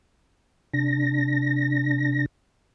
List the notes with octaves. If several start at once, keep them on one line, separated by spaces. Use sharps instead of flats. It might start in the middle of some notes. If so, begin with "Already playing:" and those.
C3 D4 A#6